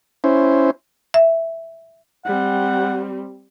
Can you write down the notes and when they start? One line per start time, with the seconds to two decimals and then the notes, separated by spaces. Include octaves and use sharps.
0.24 C#4 E4 C5
1.14 E5
2.25 G3 C4 F#5